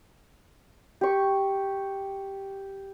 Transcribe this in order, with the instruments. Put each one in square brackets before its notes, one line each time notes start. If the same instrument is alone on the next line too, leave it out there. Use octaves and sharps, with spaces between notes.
[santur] G4 C#6